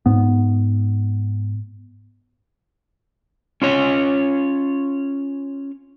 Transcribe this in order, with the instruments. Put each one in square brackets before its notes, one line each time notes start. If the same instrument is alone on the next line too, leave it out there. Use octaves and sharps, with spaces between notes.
[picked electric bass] G#2 B3
[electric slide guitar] C#4 F4 C#5